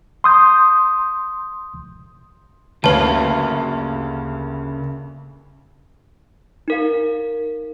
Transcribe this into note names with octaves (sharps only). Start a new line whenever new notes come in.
C6 D#6 G6
D2 G2 C#3 A#3 B4 C#5 F5 A5
D#4 A#4 F5